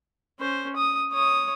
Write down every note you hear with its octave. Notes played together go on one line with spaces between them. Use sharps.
C#4 C5
D#6
C#5 D#6